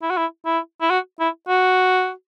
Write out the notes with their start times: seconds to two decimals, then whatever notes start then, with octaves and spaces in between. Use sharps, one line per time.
0.02 E4
0.10 F#4
0.17 E4
0.45 E4
0.81 E4
0.90 F#4
1.20 E4
1.49 F#4